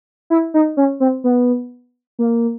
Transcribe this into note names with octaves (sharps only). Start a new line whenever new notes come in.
E4
D#4
C#4
C4
B3
A#3